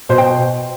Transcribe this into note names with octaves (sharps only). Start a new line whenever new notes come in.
B2 C5
G5